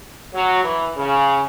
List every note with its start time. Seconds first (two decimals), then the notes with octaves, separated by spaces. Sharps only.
0.34 F#3
0.64 E3
0.96 C#3